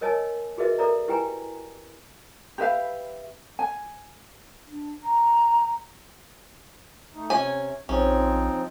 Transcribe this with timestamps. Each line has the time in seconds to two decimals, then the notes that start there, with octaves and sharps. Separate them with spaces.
0.01 A#4 C#5 D#5 G#5 A5 E6
0.58 F#4 G#4 A#4 B4 D#5 E5
0.79 A4 A#4 D5 E5 A#5
1.08 E4 G4 B4 G5 G#5 A#5
2.58 G4 B4 E5 F5
3.59 G#5
4.67 D4
5.03 A#5
7.14 A3 D#4
7.30 C3 C#4 G#5
7.89 A#1 F3 C4 C#4 D#4